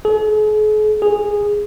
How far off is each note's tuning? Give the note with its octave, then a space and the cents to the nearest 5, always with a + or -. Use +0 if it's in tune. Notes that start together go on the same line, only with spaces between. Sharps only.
G#4 +45
G#4 -10